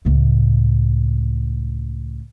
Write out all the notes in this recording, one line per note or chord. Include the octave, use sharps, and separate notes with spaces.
C#2 A2